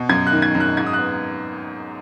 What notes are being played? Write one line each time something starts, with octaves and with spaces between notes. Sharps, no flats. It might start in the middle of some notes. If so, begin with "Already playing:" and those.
Already playing: B2
F#2 G#6
F#6
D#3
G#6
F#2
F#6
G#2 G#6
D#6
F#6
B3